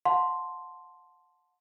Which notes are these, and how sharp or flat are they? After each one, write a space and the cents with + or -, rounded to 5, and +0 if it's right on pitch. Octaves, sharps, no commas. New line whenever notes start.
F#5 -40 A5 +0 C6 +0